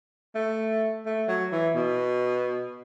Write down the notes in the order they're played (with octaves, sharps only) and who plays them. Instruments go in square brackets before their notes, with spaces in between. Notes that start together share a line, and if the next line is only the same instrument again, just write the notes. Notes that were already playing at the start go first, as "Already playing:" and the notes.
[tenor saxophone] A3
A3
F#3
E3
B2